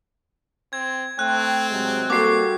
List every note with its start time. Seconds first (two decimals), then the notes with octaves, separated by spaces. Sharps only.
0.73 C4 G#6
1.19 A3 C4 G5 F#6
1.70 C3 F#3 G#3
2.10 G3 A#3 F#4 G4 A4 D6 C7